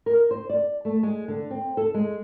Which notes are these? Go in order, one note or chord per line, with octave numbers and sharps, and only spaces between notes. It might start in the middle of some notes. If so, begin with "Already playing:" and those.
A#4
C5
D5
A3
G#3
D3
C4
A4
G#3